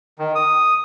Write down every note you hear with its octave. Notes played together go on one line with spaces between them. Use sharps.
D#3
D#6